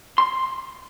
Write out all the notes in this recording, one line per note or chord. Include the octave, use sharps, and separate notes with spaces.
C6